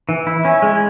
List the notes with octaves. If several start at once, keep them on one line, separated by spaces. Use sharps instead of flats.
E3
E4
C#4
G#3